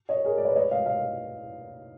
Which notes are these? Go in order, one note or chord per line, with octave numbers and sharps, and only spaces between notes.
C#5 D#5
G#4 A#4
D5
B4 C#5
C#5 D#5
D#5 F5
D#5 F5